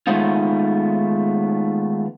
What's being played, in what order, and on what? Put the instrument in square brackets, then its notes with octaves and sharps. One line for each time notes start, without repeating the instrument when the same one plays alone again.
[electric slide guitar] D#3 G#3 A3 B3 D#4 F4